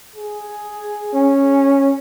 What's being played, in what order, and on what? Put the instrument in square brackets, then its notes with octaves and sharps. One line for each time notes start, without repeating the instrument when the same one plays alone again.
[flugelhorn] G#4
[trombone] C#4